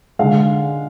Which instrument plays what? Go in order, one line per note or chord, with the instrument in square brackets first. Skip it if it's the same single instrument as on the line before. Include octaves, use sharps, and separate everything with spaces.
[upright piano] D3 G#3 F5